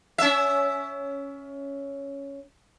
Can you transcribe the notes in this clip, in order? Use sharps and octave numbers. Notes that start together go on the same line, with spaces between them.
C#4 E5